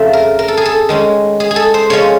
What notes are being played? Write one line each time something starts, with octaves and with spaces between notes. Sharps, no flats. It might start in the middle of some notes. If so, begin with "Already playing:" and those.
Already playing: F2 C#3 F3 A3 E5
A#4
A#4
A4
G#4
A4
D#3 G#3 C#4
G#4
G#4
A4
C5
C#3 F3 G#3 C#4 C#5